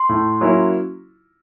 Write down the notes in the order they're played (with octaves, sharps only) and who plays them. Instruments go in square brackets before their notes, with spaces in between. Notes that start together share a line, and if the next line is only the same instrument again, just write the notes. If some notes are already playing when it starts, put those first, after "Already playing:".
Already playing: [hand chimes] C6
[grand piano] A2
F#3 A#3 C#4 E4